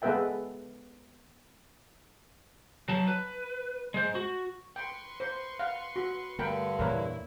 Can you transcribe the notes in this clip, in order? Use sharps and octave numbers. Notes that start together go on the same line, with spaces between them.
G#3 B3 A4 B4 E5 G5
F#3 A5
B4
G#3 C5
F#4
B4 G5 C6 C#6
C5
F5 F#5
F#4
G2 D3 A3 A#4 G5 B5
E2 A#2 E4 A#4 B4 C#5